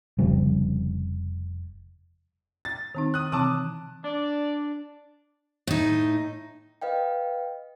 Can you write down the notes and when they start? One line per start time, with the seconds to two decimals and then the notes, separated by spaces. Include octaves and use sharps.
0.19 F1 F2 C#3 G3
2.65 A6
2.95 D#3 C4 D#4
3.14 D#6 F#6
3.32 C3 E3 C4 A5 D6 D#6
4.04 D4 D5
5.67 A2 D#4
6.82 B4 D#5 F5 G5